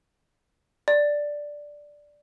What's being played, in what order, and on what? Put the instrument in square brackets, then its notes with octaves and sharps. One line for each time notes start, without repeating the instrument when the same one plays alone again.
[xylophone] D5